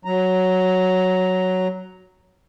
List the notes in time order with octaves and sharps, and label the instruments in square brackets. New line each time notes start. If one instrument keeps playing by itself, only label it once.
[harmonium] F#3 A#5